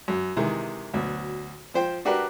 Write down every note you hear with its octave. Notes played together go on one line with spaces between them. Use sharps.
F#2
C3 D#3 E3 G#3
D2 B2 F#3
F3 C5 G5
D4 F#4 G4 A#4 B4